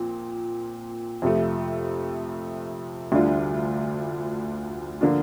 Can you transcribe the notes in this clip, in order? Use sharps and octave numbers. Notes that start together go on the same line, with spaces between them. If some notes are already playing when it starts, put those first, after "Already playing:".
Already playing: A#2 F3 C4
F2 C3 F3 A3
D2 D3 G3 D4 F4
D3 F3 A#3 D4 F4